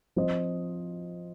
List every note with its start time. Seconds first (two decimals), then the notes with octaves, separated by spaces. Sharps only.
0.16 F3 C4 F4 C5 D#5